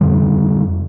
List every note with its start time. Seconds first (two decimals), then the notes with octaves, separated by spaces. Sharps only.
0.01 F2 D3 G3